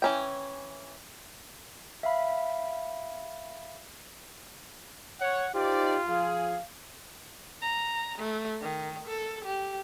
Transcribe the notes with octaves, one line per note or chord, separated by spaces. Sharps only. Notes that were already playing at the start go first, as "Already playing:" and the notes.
E3 C#4 G5
E5 F5 B5
C#5 F#5
D#4 F4 G4 C5 D5
F3 G#4 F5
A#5
A3
D#3
A4
G4